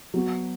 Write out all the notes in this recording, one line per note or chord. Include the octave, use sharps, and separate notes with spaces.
F#3 B3 F#4